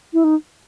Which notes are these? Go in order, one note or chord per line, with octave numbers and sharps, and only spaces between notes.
E4
D#4